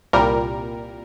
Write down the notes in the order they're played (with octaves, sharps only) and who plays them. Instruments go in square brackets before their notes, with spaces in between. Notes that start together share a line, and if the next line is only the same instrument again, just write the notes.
[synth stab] C2 A#2 G3 A#4